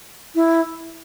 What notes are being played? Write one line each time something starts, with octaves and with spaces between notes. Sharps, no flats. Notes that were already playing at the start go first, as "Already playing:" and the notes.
E4